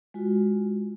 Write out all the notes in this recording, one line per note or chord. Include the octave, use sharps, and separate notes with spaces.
G#3 F4 F#4